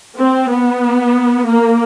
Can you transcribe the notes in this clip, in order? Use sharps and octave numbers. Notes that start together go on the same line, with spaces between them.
C4
B3
A#3